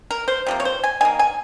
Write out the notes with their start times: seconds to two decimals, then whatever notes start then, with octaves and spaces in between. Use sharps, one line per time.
0.11 A#4
0.28 C5
0.46 C3 F3 A#3
0.60 C#5
0.65 C5
0.84 G#5
1.01 D#3 A#3 G#5
1.19 G#5